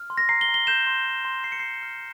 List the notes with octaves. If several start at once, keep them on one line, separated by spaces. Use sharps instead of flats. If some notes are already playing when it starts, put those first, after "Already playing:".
Already playing: F6
C6
A#6
A#5 C7
G7
A#5
G7
G6 E7
C6
G6
C6
C6 C7
C#7
C6 C7
F6